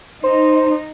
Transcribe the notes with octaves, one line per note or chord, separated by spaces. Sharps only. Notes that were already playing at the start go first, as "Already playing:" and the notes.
D#4 C5